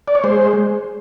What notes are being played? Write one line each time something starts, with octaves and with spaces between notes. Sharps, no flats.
D5
C#5
G#3 C5